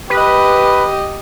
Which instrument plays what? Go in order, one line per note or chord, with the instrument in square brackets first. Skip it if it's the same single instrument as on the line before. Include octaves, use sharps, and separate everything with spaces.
[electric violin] G4 D#5 [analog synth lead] B4